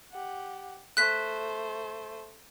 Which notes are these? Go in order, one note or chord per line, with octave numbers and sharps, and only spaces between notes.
G4 F#5
A3 C5 F#6 B6